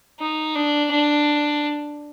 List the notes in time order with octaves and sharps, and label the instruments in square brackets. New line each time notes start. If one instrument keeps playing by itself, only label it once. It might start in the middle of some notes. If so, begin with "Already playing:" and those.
[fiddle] D#4
D4
D4